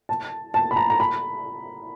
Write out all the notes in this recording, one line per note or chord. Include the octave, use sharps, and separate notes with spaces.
A5
A5
B5
A#5
A#5
B5